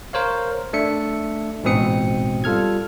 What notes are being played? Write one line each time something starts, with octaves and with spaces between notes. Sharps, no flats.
A#4 C5 C#5 F5
A3 D4 E5 C#7
A1 G#2 B2 C4 D#6 C#7
G3 F4 A4 F6 G#6